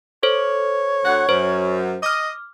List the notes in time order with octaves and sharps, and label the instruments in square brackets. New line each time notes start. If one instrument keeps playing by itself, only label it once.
[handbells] A4 C5 [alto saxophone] C#5
[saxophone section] D2 F#5
[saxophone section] F#2 [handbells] C5
[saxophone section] D#5 [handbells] D6 F6